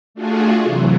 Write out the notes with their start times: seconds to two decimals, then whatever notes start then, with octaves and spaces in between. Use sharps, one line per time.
0.15 A3 D4 F4 F#4 G#4
0.64 C3 E3 F#3